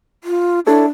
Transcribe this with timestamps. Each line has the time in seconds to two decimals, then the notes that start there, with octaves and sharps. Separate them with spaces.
0.24 F4
0.67 D4 E4 A4 C#5